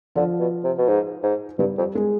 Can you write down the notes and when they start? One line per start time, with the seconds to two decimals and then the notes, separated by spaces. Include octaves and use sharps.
0.15 D3 F3 F4
0.40 B2
0.64 C3
0.78 B2
0.88 G#2
1.23 G#2
1.59 G2 G3 G4
1.78 F2
1.95 G#3 G#4